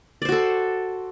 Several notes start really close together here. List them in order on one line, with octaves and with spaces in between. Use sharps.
D5 C5 F#4 A4